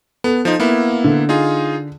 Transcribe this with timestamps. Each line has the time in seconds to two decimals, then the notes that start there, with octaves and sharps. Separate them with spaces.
0.24 B3 A4
0.45 F3 D#4
0.60 A#3 B3 E4
1.04 D3
1.29 D#4 F4 G#4